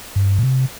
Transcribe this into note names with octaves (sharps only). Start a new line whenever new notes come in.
G2
A#2
C3